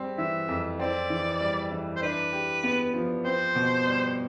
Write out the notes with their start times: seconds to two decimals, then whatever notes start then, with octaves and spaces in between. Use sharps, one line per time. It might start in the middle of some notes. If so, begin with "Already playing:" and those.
Already playing: G3 C4
0.18 E3 E5
0.48 F2
0.79 C4 D5
1.10 E3
1.41 G3
1.71 E3
1.96 C5
2.02 D4 B4
2.32 G4
2.63 B3
2.94 F3
3.24 C4 C5
3.56 B2
3.86 G3